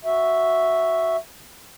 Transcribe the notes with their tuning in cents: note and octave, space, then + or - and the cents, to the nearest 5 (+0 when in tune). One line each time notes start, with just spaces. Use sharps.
F#4 +0 E5 +0